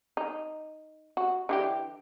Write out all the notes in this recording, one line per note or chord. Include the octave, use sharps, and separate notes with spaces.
D#4
F#4
D3 E3 G4